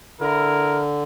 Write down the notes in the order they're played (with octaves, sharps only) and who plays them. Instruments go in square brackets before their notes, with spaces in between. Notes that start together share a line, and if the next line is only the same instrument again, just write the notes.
[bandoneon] D3 [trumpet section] E4 A#4